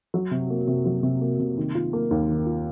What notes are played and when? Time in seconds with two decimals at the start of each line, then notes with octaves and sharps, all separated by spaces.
0.14 F#3
0.31 C3
0.50 A#3
0.67 C3
0.86 F#3
1.03 C3
1.21 A#3
1.39 C3
1.58 D#3
1.75 F4
1.93 A#3
2.11 D#2
2.29 D#3
2.46 F4